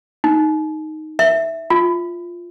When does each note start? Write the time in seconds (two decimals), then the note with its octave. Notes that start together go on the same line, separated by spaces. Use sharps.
0.24 D#4
1.19 E5
1.70 F4